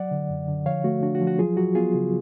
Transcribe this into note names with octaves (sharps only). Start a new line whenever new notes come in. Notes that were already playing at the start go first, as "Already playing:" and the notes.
Already playing: F#3 D5 F#5
D3
F#2
D3
F3 C#5 F5
A3 F#4
D4 F#4
F#4
F3
F#4
F#3 F4 G#4
F#3 F#4
B3 F4 G#4
C#3